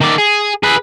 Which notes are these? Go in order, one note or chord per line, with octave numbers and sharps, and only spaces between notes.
D#3 D5
G#4
G#4 B4